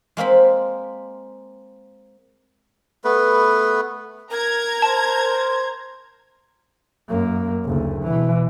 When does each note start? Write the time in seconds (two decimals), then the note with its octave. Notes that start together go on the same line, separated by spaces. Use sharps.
0.17 G#3 A#3 C4 B5
3.04 A3 B3 B4
4.31 A#4 A#5 G#6
4.82 C5 A5
7.09 F#2 A#3
7.64 F#1 D2
8.04 B2 E3